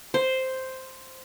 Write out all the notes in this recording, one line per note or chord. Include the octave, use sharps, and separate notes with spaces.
C5